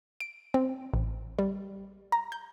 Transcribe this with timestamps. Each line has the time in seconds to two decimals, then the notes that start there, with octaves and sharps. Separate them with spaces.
0.20 D7
0.54 C4
0.94 A1
1.39 G3
2.12 A#5
2.32 G6